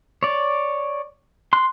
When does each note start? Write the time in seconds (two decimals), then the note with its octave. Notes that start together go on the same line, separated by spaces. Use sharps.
0.23 C#5 D5
1.53 C6 F#6